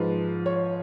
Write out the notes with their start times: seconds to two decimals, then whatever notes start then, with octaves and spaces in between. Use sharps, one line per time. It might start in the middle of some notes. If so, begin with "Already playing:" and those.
Already playing: G#2 F3 B4
0.46 C#5